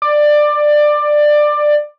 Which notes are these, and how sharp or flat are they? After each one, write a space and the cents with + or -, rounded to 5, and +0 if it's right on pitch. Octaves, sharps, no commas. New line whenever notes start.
D5 +15